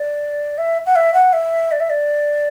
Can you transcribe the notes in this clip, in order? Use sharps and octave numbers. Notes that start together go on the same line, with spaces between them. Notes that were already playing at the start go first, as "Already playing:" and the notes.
Already playing: D5
E5
F#5
E5
F#5
E5
D5
E5
D5